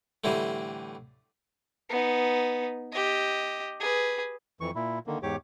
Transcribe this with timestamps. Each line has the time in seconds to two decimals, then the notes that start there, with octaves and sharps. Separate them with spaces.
0.24 A2 D3 E3 G3 C4
1.89 B3 D#4
2.92 G4 D#5
3.80 G#4 B4
4.61 F2 E3 C#6
4.75 A#2 E4
5.07 D3 D#3 A#3
5.23 E2 G#2 G4 C#5 D6